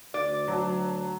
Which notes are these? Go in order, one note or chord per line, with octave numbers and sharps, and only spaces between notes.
D2 D5
F#3 A5